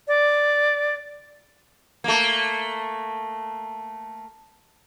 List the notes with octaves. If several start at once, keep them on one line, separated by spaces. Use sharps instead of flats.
D5
A3 A#3